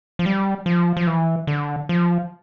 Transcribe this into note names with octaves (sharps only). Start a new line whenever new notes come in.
F3
G3
F3
F3
E3
D3
F3